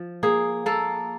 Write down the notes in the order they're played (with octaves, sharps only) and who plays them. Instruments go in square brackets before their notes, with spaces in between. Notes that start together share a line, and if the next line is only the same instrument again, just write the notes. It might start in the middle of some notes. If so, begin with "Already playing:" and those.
Already playing: [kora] F3
A#3 G#4
A#3 A4